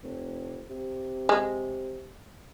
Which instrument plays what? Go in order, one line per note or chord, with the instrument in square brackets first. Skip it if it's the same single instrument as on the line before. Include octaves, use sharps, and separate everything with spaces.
[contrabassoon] F1
C3
[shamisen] G#3